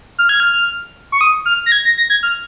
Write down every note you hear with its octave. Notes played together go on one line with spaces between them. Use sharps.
F6
G#6
F6
C#6
D#6
F6
A#6
G#6
A#6
A#6
G#6
F6